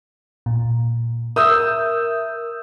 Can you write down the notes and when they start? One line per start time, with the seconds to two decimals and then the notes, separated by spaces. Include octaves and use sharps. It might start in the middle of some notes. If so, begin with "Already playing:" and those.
0.46 A#2
1.36 A#4 E5 D#6 E6 G6